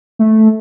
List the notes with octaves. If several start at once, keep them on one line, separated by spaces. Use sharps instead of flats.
A3